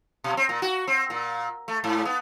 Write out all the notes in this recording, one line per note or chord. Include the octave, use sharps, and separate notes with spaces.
B2
C4
A#2
F#4
C4
A#2
A3
G#2
B3